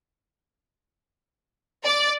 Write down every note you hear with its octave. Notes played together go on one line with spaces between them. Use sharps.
D5